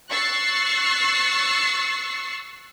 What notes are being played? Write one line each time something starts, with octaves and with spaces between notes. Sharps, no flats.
C#6 E6 F#6 A6 C7